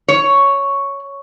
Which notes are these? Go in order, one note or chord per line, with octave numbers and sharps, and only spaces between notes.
C#5